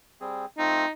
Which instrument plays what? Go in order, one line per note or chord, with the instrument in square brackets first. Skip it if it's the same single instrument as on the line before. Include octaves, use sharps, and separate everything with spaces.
[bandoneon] G3 C4 G#4
[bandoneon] A3 C4 F4 [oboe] D#4